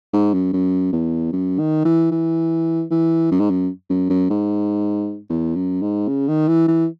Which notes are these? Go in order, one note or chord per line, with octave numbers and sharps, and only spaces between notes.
G#2
F#2
F#2
E2
F#2
D#3
E3
E3
E3
F#2
G#2
F#2
F#2
F#2
G#2
E2
F#2
G#2
C#3
D#3
E3
E3